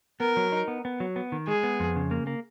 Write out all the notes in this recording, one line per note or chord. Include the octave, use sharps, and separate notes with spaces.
B3 A#4
F#3
D#4
B3
B3
F#3
B3
D#3
G#3 G#4
B3
F2
C#3
A#3
A#3